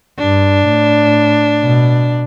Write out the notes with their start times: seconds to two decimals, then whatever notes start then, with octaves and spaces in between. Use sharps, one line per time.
0.19 G2 D4
0.67 A2
1.62 B2